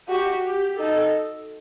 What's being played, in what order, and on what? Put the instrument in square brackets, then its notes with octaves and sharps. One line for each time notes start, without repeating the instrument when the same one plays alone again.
[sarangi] F#4 [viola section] G4
[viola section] G4
[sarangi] D#4 [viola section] A4